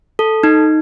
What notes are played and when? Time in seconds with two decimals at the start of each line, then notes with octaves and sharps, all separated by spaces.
0.19 A4
0.43 D#4